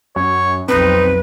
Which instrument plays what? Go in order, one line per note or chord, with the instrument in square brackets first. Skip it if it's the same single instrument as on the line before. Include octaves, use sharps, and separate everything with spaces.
[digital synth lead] F#2 [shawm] C#5
[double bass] B1 F2 [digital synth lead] C4 [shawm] D#4 [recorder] B4